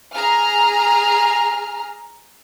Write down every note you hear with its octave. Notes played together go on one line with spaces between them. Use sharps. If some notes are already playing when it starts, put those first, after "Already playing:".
G#4 A#5 F6